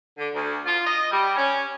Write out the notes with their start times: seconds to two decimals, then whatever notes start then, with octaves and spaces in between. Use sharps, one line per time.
0.18 D3
0.34 D2
0.65 F4
0.85 D#5
1.11 G3
1.36 C#4